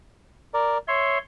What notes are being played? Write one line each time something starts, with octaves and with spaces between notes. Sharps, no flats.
A#4 D5
C#5 E5 C6